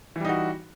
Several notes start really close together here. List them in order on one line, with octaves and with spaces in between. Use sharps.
E3 G3 D#4 F#4